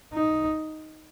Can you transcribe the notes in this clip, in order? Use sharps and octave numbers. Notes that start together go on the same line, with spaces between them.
D#4